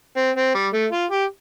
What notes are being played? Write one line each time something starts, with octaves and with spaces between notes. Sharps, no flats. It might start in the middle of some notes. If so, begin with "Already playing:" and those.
C4
C4
G3
A3
F4
G4